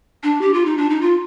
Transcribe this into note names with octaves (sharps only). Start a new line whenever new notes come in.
D4
G4
F4
D#4
D4
D#4
F4